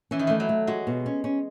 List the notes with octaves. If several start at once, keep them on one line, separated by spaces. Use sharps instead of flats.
E3 C#4
D#3
E3 A3
F#3
A3
G#3 F#4
B2
C#4
C#4